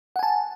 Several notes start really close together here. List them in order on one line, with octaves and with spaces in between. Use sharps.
F#5 G#5 A5